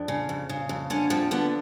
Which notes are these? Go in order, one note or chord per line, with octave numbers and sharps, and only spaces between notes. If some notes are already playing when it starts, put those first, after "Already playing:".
Already playing: F2 D4
C#3
F2
C#3
F2
D3 C#4
F3 C4
D3 B3